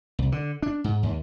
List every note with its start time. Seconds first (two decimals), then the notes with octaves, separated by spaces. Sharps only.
0.19 C2
0.32 D3
0.62 D4
0.84 G#2
1.03 D#2